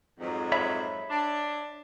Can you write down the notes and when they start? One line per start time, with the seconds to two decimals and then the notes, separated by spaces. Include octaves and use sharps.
0.20 F2 G#2 F#3
0.52 C#5 E5 B5
1.10 D4